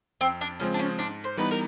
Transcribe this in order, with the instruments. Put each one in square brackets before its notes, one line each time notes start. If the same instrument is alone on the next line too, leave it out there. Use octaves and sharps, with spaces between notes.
[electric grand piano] F2 [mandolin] C4
[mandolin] D4
[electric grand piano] C#3 F3 G#3 C4 [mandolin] C#4
[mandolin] D4
C#4
[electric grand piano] G#2 [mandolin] D4
[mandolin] C5
[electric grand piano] E3 G3 B3 D#4 [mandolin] B4
[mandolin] A#4